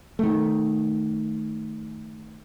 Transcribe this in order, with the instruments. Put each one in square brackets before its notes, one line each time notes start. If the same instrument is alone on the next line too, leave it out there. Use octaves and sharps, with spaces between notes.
[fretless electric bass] D#3 A3